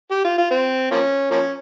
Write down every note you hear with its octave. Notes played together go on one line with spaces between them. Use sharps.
G4
F4
F4
C4
F3 A#3 C#4
F3 A#3 C#4